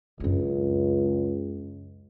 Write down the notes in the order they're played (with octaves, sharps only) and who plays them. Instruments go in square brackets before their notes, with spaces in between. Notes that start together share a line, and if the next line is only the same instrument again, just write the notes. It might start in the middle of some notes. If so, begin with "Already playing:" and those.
[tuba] C#2 [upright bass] F#2 D4